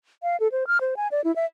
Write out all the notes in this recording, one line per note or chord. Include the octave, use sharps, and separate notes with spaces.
F5
A4
C5
F6
C5
G#5
D5
E4
E5